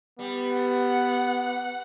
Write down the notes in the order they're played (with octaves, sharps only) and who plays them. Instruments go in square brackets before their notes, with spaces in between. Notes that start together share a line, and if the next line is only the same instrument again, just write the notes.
[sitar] G3 [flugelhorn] B3
[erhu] F#5